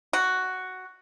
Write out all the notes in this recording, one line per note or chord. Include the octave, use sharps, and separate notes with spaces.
F#4